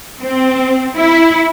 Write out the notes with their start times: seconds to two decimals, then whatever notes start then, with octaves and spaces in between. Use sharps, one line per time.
0.22 C4
0.96 E4